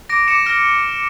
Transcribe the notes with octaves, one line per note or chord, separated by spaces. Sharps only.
D6 A#6 D7
D6 C#7 E7
F6 A#6 D7